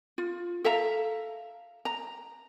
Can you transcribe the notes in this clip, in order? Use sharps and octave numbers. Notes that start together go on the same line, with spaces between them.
F4
A4 E5 F5 A#5
A#5